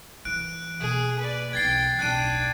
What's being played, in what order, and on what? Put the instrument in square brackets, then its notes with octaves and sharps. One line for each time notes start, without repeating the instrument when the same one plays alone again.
[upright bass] E3 [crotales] F#6 D7
[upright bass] B2 A#3 [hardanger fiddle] G#4
[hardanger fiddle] B4 D5
[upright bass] B1 E3 [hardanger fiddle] G5 [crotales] G#6 A6 C7
[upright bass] D1 B1 [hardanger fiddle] D4 G5 [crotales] F#6 D#7